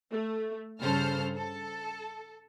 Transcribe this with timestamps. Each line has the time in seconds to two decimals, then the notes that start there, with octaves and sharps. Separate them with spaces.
0.11 A3
0.80 G2 C#3 A4 C5 F6
1.35 A4